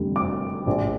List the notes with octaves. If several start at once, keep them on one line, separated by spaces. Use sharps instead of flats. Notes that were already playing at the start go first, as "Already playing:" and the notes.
Already playing: F1 F2 D3 G3
D6
A#1 A2 F3